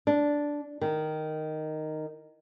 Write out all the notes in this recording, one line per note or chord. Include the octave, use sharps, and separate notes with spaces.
D4
D#3